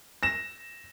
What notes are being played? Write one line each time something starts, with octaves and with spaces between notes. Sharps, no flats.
A#6 E7